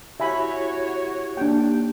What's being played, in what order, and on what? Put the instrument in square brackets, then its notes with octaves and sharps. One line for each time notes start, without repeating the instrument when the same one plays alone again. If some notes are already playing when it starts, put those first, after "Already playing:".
[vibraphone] E4 G4 [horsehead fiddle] F#4 C#5 [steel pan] E5 G#5 B5
[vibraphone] A#3 D#4 G4 [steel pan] D4 G5